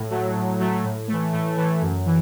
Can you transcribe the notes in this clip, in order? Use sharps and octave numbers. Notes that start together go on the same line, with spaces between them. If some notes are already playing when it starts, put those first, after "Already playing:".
Already playing: A2
F#3 A3
A2
F#3 A3
A2
E3 A3
A2 A3
E3 A3
F#2
E3